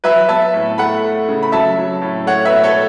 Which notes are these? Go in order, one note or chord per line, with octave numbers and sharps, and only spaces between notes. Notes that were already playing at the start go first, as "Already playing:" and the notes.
F#3 B4 E5
B3 E5 A5
A2
A3 F#5 B5
A3
C#3
B5
F#3 E5 A5
F#3
A2
A3 C#5 F#5
B4 E5
B2
A4 C#5